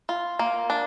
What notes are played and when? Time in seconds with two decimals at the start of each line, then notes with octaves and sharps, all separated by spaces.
0.09 F4
0.39 A#3
0.70 D4